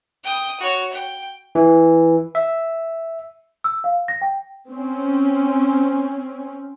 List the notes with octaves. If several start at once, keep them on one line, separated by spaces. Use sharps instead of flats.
G5 D#6
F#4 C#5
G5
E3
E5
E6
F5
A#6
G5
C4 C#4